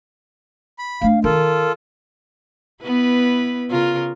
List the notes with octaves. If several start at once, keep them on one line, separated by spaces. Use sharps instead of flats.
B5
A3 D4 F5
D#3 F4 A4 A#4
B3 E4 B4
C#3 F4 A#4